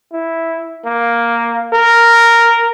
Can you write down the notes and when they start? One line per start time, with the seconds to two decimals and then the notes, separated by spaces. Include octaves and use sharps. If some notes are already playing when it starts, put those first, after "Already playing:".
0.13 E4
0.85 A#3
1.73 A#4